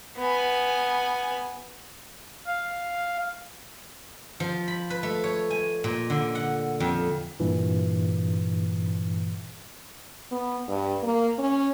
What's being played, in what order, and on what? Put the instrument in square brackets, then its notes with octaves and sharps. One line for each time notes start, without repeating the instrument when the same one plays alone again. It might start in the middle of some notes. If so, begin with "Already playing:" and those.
[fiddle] B3 G#5
[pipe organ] F5
[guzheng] F3
B5
B4
A3
C#5
G#5
A#2
D3
F#5
F2
[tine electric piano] G2 A#2 E3
[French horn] B3
G2
A#3
C#4